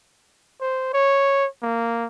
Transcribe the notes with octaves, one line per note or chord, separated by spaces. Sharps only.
C5
C#5
A#3